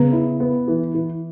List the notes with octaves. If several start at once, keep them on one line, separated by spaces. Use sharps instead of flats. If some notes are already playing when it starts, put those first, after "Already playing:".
Already playing: C#3 B3 B4
E4
B3
E3
E3